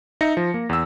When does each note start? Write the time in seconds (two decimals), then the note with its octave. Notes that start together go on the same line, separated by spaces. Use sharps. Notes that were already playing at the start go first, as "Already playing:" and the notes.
0.21 D#4 E5 A#6 C#7
0.37 F3
0.54 A#3
0.69 E2 E6